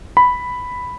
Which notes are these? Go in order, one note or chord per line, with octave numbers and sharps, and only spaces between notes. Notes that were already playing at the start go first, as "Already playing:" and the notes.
B5